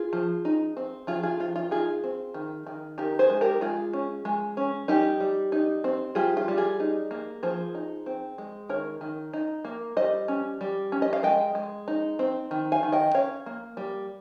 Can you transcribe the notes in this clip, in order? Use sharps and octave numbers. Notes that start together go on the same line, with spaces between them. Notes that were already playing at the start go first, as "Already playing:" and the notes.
Already playing: F4 G#4
F3
D#4
C4
F3 F4 G#4
F4 G#4
F3 F4
F4
D#4 F4 G#4
C4
D#3
D#3
D#4 G4 A#4
G#4 C5
G#3
G4 A#4
G#3 F4 G#4
C#4
G#3
C#4
G3 D#4 G4
G3
D#4
C4
G3 F4 G#4
F4
G3
F4 G#4
D#4
A#3
F3 G#4 C5
D#4
C4
G#3
D#3 A#4 C#5
D#3
D#4
A#3
G3 C5 D#5
C#4
G3
C#4
D#5
F5
G#3 D#5 G5
G#3
D#4
C4
D#3
F5 G#5
D#3
D#5 G5
C#4 C#5 F5
A#3
G3